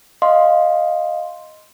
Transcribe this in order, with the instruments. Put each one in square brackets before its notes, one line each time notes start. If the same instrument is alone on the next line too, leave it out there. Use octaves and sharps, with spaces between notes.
[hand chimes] D#5 F5 C6